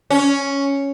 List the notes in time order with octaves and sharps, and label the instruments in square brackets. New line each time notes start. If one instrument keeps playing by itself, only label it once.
[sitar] C#4